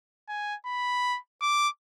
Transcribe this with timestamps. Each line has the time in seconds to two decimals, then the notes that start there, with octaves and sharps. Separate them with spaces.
0.29 G#5
0.66 B5
1.42 D6